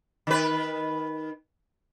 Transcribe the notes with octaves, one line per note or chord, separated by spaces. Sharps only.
D#3 B4